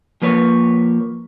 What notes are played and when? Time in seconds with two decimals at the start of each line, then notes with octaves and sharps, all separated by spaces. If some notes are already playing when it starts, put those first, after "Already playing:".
0.22 F3 A#3 B4 C#5